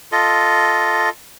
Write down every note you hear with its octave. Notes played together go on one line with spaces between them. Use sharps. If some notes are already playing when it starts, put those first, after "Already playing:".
F4 A4 D#5